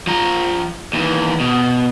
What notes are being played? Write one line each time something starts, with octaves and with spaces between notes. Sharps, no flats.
F3 A#5
D#2 E3
B2